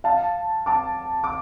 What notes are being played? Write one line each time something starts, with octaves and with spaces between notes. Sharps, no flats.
F5 A5
A5 D6
D6